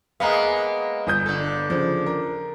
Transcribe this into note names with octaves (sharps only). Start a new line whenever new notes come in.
G#3 A#3 B3 F5 A#5
G1 D#6 G6
D3 A4
C#3 F3
A#4